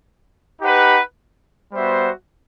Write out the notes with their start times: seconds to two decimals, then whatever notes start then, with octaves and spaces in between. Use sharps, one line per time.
0.61 D#4 G4 B4 F#5
1.71 G3 B3 F#4 C5 E5